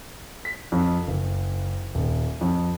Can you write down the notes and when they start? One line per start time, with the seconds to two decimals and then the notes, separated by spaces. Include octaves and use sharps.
0.45 B6
0.72 F2
1.07 F#1
1.95 D#1
2.41 F2